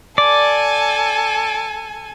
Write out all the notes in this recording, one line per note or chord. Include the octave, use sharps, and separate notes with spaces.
A4 D5 G#5